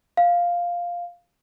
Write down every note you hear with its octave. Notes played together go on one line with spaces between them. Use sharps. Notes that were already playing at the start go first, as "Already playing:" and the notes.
F5